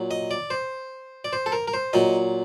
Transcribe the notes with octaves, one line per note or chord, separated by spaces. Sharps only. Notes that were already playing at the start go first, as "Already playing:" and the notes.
Already playing: A#2 F#3
D#5
D5
C5
D5
C5
A4
A#4
A#4
C5
A#2 F#3 D#5